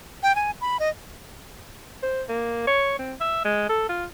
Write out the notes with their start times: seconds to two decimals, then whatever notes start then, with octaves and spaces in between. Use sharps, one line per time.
0.23 G5
0.36 G#5
0.61 B5
0.80 D#5
2.03 C5
2.29 A#3
2.67 C#5
2.99 C4
3.21 E5
3.45 G#3
3.69 A4
3.89 F4